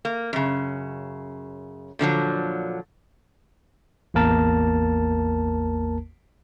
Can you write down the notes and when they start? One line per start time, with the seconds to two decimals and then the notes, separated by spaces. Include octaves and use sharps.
0.05 A#3
0.33 F#2 C#3
1.99 A#2 D3 F3 F#3
4.14 A1 E2 A#3 A#4 A5